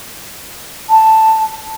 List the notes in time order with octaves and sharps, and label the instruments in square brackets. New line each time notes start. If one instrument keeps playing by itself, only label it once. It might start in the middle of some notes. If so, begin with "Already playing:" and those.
[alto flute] A5